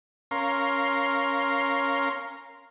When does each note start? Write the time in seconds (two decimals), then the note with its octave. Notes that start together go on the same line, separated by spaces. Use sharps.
0.31 C#4 A#4 F5 C6